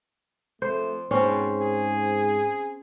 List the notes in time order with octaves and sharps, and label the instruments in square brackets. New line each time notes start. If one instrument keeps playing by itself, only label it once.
[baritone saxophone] F2 [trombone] A3 [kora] C5
[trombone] G#2 [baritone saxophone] B2 [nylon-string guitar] C4 C5 [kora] C#4
[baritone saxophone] G#4